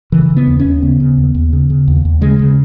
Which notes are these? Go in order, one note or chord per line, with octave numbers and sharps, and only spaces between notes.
C#3 E3
C#3
B3
D#2
D#2 C#4
C#3 B3
C#3
D#2
D#2
C#3
C#3
D#2
D#2
C#3 G#3
C#3